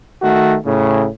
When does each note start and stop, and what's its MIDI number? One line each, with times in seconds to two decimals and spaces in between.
0.23 0.56 51
0.23 0.56 57
0.23 0.56 66
0.66 1.08 45
0.66 1.08 49